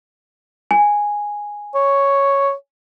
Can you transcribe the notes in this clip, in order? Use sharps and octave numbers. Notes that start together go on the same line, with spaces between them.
G#5
C#5